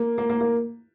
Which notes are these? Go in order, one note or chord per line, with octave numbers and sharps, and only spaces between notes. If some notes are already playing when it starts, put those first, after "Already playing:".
Already playing: A#3
A#3
A#3
A#3